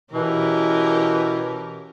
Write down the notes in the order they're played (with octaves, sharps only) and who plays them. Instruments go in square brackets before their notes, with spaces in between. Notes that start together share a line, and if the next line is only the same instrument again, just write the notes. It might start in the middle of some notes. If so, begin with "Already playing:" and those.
[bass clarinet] B2 [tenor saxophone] E3 [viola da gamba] C#4 G4 A#4